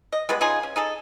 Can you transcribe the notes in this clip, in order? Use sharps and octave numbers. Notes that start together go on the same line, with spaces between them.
D#5
G3 G#3 B3 B4
C#3 D#4 F4 G#4
C#4
D#4 G#4 A4